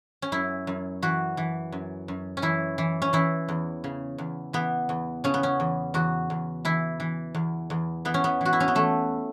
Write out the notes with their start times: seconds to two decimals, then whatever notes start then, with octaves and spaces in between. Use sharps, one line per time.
0.22 C#4
0.32 F#2 E4
0.67 F#2
1.02 E3 F#4
1.37 E3
1.72 F#2
2.08 F#2
2.37 C#4
2.42 E3 E4
2.78 E3
3.02 C#4
3.13 E3 E4
3.49 E2
3.84 C#3
4.18 E2
4.53 E3 B3
4.89 E2
5.24 C#3 C#4
5.34 B3
5.43 C#4
5.60 E2
5.94 E2 F#4
6.30 E2
6.65 E3 E4
7.00 E3
7.35 E2
7.70 E2
8.05 E3 B3
8.14 C#4
8.24 B3
8.41 E3 F#4
8.53 E4
8.60 C#4
8.68 B3
8.75 E3 A3